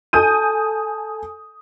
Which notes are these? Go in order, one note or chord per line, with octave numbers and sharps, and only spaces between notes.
A4 G#5 D#6 G6 D#7